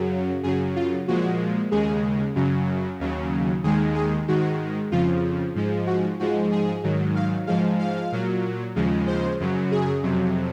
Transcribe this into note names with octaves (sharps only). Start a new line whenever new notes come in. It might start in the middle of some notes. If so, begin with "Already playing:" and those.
Already playing: F#2 C#3 F#3
F#2 C#3 F#3 G#4
F4
A#2 F3 G#3 F#4
D#2 C#3 G#3 G#4
F#2 C#3 F#3
D#2 C#3 F#3
D#2 D#3 G#3 G#4
G#4
G#2 D#3 G#3 F#4
F2 C#3 F3 F4
G#2 F3 G#3
F#4
G#2 F3 G#3 F#4
G#4
G#2 D#3 F#3
F5
G#2 F3 G#3 F5
F5
A#2 F#3
D#2 C#3 F3 G#3
C5
F#2 C#3 F#3
G#4
F2 C3 F#3